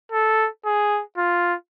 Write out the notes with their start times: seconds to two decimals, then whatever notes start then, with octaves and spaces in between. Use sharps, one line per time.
0.12 A4
0.65 G#4
1.18 F4